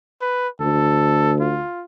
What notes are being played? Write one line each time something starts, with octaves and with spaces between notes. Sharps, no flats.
B4
D2 A4
F4